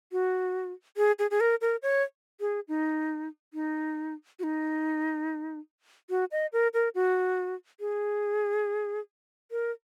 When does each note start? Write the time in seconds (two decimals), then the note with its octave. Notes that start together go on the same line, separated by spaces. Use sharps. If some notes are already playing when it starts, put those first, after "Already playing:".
0.12 F#4
0.97 G#4
1.19 G#4
1.31 G#4
1.40 A#4
1.61 A#4
1.82 C#5
2.40 G#4
2.68 D#4
3.54 D#4
4.39 F#4
4.43 D#4
6.10 F#4
6.32 D#5
6.53 A#4
6.74 A#4
6.95 F#4
7.80 G#4
9.51 A#4